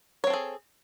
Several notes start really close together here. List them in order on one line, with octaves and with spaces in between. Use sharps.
C#5 C4 A4 G#4